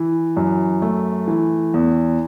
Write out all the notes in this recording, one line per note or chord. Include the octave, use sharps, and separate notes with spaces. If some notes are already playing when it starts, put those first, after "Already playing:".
Already playing: E3
F#2
A3
E3
E2